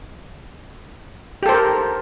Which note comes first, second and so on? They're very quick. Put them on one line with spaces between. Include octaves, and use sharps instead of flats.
G4 A4 C5 A#4